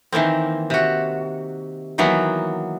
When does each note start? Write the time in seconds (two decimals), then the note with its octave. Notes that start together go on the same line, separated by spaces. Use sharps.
0.12 D#3 E3 A#3 C4
0.70 C3 F#4
1.98 D#3 E3 F#3 A#3 B3